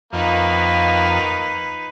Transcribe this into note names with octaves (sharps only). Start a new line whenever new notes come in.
F2 D#3 A#3 B3 D#4 B4 F5